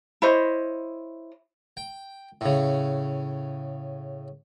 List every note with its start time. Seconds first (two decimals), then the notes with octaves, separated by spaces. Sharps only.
0.22 E4 C5 C#5 D#5
1.77 G5
2.41 A2 C#3